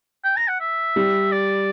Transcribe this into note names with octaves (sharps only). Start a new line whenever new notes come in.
G5
A#5
F#5
E5
G3
D5